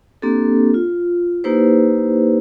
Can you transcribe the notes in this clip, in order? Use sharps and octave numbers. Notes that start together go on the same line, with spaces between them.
A#3 C4 D4 G4 A4
F4
A#3 D#4 E4 G4 B4 C5